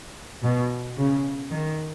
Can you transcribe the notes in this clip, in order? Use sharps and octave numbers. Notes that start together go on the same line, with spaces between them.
B2
C#3
D#3